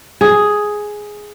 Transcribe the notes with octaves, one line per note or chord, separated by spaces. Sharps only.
G#4